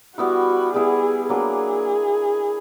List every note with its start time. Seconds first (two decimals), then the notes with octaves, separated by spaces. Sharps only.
0.18 G3 B3 E4 F#4
0.74 G3 B3 E4 G#4
1.29 F#3 A#3 D4 G#4